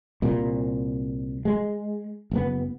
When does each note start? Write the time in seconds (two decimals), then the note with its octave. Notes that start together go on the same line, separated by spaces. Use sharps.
0.22 C2 A#2
1.45 G#3
2.31 F#1 B3